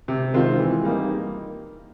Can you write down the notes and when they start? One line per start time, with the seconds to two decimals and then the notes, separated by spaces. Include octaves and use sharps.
0.08 C3
0.34 D#3 G#3 C4 F4
0.59 E3
0.84 G3 A#3 D#4